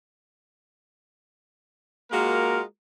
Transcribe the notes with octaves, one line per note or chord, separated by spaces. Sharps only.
G#3 A#3 F4 F#4 A#4